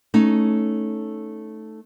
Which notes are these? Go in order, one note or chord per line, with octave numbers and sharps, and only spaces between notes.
A3 C#4 D#4